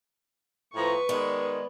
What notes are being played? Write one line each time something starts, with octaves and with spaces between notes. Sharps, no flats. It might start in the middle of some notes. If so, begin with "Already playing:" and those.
A2 F3 B4 A#5 C#6
D#3 G#3 B3 D5